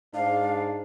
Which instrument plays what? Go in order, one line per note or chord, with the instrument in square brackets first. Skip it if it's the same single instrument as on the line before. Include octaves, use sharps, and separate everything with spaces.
[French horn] G#2 [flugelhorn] D4 [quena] F5